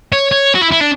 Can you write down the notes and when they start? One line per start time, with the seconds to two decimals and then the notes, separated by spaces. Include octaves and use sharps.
0.13 C#5
0.32 C#5
0.55 F#4
0.62 E4
0.72 E4
0.81 D4